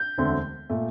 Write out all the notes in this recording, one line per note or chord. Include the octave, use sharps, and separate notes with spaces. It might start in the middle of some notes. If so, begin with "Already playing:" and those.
Already playing: G6
E1 D2 D3 A3 C4
A#2 A3